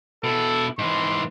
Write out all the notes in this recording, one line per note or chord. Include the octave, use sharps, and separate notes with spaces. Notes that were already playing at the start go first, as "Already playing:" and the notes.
B2 E4 A4
G#2 E3 C6